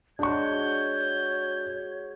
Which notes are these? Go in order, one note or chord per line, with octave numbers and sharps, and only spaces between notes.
G#3 D4 F#4 C#5 C#6 G6